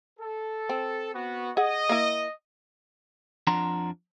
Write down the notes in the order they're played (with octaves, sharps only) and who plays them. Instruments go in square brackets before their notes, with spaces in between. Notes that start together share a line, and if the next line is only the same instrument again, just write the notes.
[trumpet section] A4
[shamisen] C4
[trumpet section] B3 F#4
[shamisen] G#4 F#5 [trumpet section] D#5
[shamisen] A#3 E4
[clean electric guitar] F2 F3 D4 F#5 A#5 C6